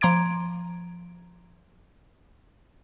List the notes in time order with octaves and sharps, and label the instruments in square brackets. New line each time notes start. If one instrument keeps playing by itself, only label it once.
[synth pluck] F3 A#5 C6 D6 G#6 D7